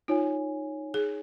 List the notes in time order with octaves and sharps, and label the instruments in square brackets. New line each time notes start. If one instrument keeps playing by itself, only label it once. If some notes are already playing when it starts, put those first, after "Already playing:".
[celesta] D#4 C#5 G#5 [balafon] F4
[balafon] G#4